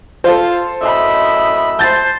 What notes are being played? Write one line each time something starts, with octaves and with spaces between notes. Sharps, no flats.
F4 A4 C5
F#2 A2 D#5 E5 B5
C5 A5 G6 A6